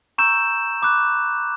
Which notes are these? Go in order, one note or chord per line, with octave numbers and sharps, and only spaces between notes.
A#5 C#6 E6 G6 E7
B5 D6 F#6